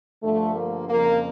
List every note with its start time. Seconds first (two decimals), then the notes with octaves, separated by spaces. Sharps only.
0.23 G2 D3 F3 A3
0.56 A#3
0.90 F2 C#3 F3 A#3